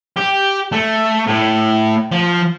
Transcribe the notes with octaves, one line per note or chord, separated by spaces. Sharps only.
G4
A3
A2
F3